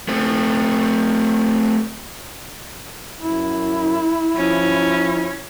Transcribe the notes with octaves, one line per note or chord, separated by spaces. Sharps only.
A3 C4
F#2 E4
F3 C#4